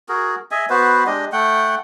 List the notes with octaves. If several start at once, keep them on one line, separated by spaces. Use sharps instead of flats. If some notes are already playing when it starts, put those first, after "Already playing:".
F#4 G#4 A#4
G#4 D#5 E5 G#5
B3 F#4 B4 C5
G#3 D4 G4 D#5
A3 F#5 G5